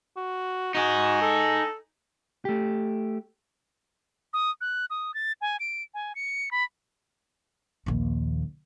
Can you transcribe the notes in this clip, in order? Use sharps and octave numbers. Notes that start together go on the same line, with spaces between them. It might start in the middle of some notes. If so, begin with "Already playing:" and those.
F#4
D#4 F#4 G#4
A4
A3 G4
D#6
F#6
D#6
A6
G#5
D7
G#5
C#7
B5
A#1 D#2